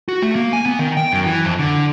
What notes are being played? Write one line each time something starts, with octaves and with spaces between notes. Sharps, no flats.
F#4
A3
A#3
G#5
B3
D#3
G5
F#2
E3
F2
D3